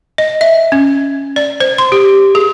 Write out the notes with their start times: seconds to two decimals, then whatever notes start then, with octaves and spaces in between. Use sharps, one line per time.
0.18 D#5
0.41 E5
0.72 C#4
1.36 D5
1.60 C5
1.78 C6
1.92 G4
2.35 G#4